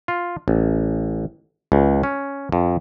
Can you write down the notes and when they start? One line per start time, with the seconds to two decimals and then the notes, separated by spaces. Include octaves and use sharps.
0.08 F4
0.48 A1
1.72 C#2
2.03 C#4
2.52 F2